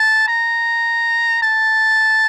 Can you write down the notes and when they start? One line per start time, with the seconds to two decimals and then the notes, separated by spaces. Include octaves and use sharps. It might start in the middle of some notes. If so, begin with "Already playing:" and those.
Already playing: A5
0.28 A#5
1.42 A5